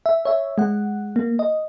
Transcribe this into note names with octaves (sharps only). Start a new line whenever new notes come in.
E5
C#5 E5
G#3 F#5
A#3
D#5